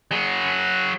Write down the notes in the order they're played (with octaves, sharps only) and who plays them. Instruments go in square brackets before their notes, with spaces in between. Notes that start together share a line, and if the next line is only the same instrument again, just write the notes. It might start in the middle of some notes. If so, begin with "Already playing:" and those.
[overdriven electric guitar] F#3 G#4